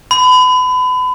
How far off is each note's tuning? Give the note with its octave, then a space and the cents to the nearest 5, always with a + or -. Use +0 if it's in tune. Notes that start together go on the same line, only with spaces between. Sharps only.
B5 +30